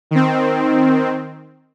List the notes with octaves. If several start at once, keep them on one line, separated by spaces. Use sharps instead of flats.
D#3 C4